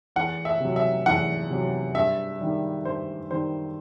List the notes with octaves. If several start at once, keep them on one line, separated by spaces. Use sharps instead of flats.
E2 F#5
E5
C3 F#3
E5
E2 F#5
C3 F#3
G2 E5
D#3 G3
G2 C5
D#3 G3 C5